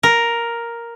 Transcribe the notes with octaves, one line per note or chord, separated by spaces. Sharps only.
A#4